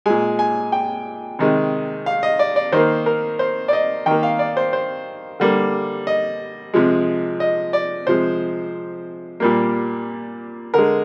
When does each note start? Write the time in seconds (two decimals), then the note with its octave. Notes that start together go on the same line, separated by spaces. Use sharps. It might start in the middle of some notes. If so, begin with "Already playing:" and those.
0.06 A#2 G#3 G#5
0.39 G#5
0.72 G5
1.39 C3 D#3 G#3
2.06 F5
2.23 D#5
2.39 D5
2.56 D5
2.72 D#3 A#3 C5
3.06 A#4
3.39 C5
3.68 D5
3.73 D#5
4.06 D#3 A#3 G5
4.23 F5
4.39 D5
4.57 C5
4.73 C5
5.40 D3 G3 A#3
6.07 D#5
6.74 C3 F3 G#3
7.40 D#5
7.73 D5
8.07 C3 F3 G#3 C5
9.40 A#2 G3 A#3
10.74 D3 G#3 A#4